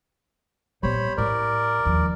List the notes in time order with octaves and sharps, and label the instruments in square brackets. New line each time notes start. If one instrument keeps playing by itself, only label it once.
[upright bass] A#2 B3 [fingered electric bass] G3 [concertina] C5 C#5 B5
[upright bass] A2 E4 [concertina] A#4 D5
[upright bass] D#2 F3